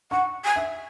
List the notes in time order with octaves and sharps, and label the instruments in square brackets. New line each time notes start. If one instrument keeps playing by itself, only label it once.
[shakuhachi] F#5 [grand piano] C#6
[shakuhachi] G#5
[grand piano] E5